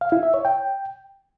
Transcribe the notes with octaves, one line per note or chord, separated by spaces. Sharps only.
F5
E4
E5
C#5
G5